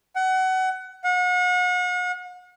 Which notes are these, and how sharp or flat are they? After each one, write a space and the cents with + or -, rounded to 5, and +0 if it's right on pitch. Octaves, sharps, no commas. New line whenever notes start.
F#5 +25
F#5 -40